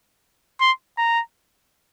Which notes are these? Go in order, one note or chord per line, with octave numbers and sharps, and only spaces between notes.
C6
A#5